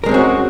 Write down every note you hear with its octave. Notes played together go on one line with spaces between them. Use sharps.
G#3 C4 C#4 F#4 A#4